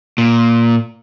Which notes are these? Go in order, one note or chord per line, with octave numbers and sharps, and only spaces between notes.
A#2